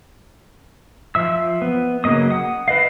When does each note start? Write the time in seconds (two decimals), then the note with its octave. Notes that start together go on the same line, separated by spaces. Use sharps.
1.15 F3 E5 E6
1.62 B3
2.04 C#3 F#3 A#3 D#5 D#6
2.30 F#5 D#6
2.68 E4 B4 D#5 F5